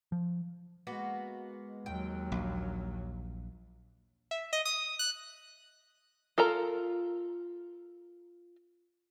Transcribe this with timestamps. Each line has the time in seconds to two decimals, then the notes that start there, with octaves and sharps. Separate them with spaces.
0.12 F3
0.87 G#3 A#3 B3 F#4
1.86 D#2 F#3 G5
2.32 A#1
4.31 E5
4.53 D#5
4.65 D#6
4.99 F#6
6.38 F4 A4 A#4 A#5